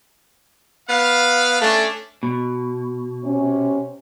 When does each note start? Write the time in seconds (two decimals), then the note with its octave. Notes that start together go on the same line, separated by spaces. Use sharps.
0.89 B3 F5
1.60 A3 C#4 D4
2.23 B2
3.24 C3 C#4